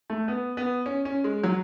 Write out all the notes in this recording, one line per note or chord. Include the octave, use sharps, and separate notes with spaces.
A3
B3
B3
C#4
C#4
G#3
F#3